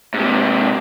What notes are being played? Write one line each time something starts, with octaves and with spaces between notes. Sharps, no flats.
G#2 C3